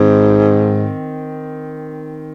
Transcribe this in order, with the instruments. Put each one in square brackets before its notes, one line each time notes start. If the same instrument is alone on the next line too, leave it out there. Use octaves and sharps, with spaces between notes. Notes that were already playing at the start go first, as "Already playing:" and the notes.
Already playing: [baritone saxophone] G#2 [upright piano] D#3 C4